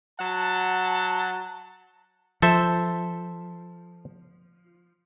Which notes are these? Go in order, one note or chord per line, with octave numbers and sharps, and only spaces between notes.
F#3 F#5 A5
F3 A4 C5 E5